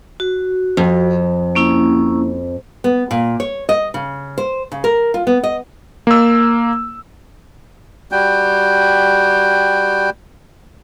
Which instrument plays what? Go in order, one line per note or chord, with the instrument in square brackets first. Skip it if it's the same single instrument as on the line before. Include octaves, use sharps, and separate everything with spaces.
[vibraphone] F#4
[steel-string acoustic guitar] F2
[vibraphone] A#3 C#4 E4
[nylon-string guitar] B3
A#2
C#5
D#5
C#3
C5
C#3
A#4
F4
B3
D#5
[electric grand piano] A#3 E6
[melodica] G3 F#4 G5